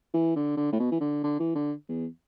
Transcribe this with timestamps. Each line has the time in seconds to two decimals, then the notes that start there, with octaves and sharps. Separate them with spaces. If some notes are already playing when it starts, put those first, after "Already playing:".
0.14 E3
0.36 D3
0.57 D3
0.73 A2
0.80 B2
0.92 E3
1.01 D3
1.24 D3
1.40 E3
1.55 D3
1.89 E2